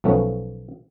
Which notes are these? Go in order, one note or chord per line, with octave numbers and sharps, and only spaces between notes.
B1 F3 A3 B3 C#4